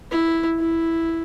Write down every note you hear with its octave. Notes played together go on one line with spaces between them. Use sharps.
E4
E4